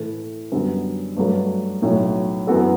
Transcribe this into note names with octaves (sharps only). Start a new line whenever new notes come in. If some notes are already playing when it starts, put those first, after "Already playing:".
Already playing: A2 E3 A3 E4
F#2 D3 G3 B3 F#4
G2 F#3 A3
B1 A2 F#3
F#2 E3 B3 F#4 A4